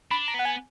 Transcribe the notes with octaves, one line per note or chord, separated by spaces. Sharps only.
D4 B5
A#5
B3 F#5
G#5